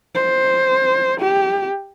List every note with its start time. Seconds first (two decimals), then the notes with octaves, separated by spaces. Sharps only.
0.15 C5
1.20 G4